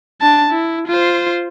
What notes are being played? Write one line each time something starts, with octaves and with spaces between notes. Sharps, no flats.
D4 A5
E4
F4 C5